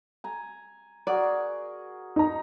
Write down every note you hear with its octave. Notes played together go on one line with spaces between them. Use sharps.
G#5 A#5
F#4 G#4 A#4 D5
D#4 A#5